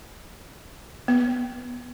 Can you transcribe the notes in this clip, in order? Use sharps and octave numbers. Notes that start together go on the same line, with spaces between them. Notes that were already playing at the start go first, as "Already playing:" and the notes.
B3